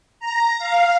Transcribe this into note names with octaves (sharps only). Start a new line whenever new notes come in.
A#5
F5